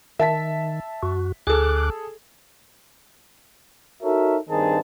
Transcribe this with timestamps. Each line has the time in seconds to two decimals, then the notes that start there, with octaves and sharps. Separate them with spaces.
0.19 D#3 E5 A5 B6
1.03 F#2 F#4
1.47 D2 G#4 A4 D6 F#6
4.03 D#4 F#4 A4 A#4 C#5 E5
4.50 G2 D#3 C4 D#4 G#4 A5